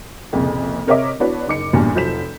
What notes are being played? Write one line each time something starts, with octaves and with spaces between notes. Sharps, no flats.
C2 F2 A#2 C#3
C3 A#4 C#5 D#5 E5 D6
B3 D4 E4 F#4 B4 C#5
F#1 D#4 D6 C#7
A1 E2 G2 A#2 F#3
F1 F3 F#3 G6 B6 E7